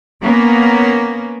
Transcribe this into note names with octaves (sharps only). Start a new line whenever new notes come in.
A#3 B3 C#4